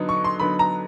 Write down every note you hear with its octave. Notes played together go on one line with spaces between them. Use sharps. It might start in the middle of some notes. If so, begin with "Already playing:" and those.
Already playing: D3 F#3 B3 D#4
C#6
C6
D3 F#3 B3 D#4 B5
A#5